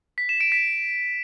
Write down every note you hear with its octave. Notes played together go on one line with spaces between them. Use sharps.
B6
E7
D7
B6